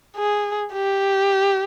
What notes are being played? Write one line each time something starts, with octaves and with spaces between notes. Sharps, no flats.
G#4
G4